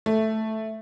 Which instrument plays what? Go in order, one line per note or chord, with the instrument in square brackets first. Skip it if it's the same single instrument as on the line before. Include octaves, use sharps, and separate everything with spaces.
[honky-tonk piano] A3